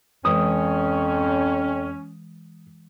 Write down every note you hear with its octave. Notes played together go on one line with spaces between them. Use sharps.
F2 E3 G#3 C#4 B4 D#6